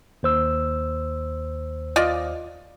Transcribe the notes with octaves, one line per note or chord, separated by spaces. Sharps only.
D#2 C5 E6
F4 D5 D#5